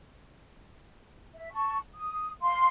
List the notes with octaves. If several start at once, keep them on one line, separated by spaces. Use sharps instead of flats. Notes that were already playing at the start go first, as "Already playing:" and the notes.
E5
A5 C#6
D#6
F5 C6